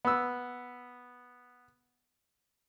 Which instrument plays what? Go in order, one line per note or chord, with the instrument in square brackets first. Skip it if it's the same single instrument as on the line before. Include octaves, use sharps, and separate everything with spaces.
[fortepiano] B3 E6